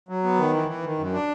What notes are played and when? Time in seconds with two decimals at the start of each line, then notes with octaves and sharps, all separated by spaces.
0.09 F#3
0.24 B3
0.38 D#3
0.54 E3
0.68 E3
0.84 D#3
0.98 F#2
1.14 D4